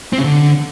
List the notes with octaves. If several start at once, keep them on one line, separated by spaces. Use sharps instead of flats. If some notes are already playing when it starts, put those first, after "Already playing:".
C4
C#3
D3